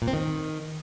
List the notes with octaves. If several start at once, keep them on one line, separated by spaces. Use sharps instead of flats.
A#2
C4
D#3